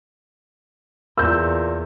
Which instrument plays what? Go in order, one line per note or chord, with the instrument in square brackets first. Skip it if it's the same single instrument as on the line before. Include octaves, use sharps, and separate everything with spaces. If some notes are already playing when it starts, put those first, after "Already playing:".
[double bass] E2 [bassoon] A#2 [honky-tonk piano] E6 G6